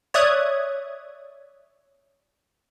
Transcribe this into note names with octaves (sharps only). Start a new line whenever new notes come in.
C#5 D5 E5 D#6 F#6 G#6